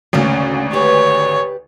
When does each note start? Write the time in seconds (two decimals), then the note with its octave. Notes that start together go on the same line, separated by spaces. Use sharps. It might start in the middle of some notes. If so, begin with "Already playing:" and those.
0.13 G#1 D2 C#3 A#3 C#4
0.73 G4 B4 C#5